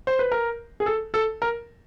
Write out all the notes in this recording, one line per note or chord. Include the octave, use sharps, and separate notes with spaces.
C5
B4
A#4
G#4
A4
A4
A#4